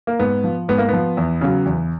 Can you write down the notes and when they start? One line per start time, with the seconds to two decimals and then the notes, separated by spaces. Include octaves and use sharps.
0.07 A#3
0.19 G#2 B3
0.44 F3
0.68 G#2 B3
0.78 A#3
0.88 F3 B3
1.17 E2
1.41 C#3 F#3
1.66 E2